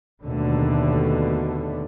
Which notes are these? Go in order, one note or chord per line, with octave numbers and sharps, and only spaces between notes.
D#2 B2 D3 A3